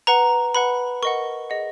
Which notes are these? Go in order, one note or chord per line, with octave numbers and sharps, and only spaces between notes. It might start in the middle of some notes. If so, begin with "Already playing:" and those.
B4 F#5 A#5
B4 F#5 B5
A#4 D#5 F#5 C#6
G#4 D#5 F#5